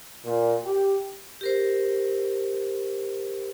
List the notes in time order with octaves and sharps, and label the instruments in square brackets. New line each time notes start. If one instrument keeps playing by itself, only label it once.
[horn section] A#2
G4
[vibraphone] G4 A#4 C5